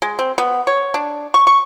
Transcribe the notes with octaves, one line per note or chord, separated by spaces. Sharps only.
G#3
C4
B3
C#5
D4
C#6
C#6